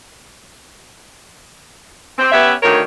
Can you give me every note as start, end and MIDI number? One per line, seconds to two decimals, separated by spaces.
2.19 2.32 60
2.32 2.53 59
2.32 2.53 61
2.32 2.53 67
2.32 2.53 71
2.32 2.53 76
2.63 2.81 38
2.63 2.81 43
2.63 2.81 51
2.63 2.81 58
2.63 2.81 70
2.63 2.81 73